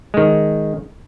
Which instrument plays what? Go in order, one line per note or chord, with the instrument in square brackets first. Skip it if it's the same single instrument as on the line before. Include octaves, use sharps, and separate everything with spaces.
[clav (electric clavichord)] D#3 G#3